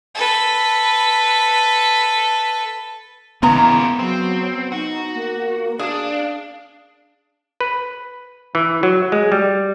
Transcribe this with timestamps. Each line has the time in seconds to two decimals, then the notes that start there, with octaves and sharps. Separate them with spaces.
0.15 A4 B4
3.43 C#3 E3 G#3 A#3 B3 B4 A#5
3.99 F#3 C4
4.72 D#4 F#4
5.14 A#3
5.79 D4 G#4 F5
7.61 B4
8.55 E3
8.83 F#3
9.12 G#3
9.32 G3